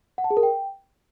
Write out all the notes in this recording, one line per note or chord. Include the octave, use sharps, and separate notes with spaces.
F#5
A5
G#4
A#4
G5